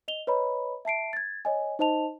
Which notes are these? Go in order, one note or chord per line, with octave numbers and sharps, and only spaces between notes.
D#5 F7 G7
B4 C#5 D#5 A#5 B5
E5 A5 C7 D7
G#6 A6
C#5 D#5 G#5
D#4 C5 D#5 A5 F7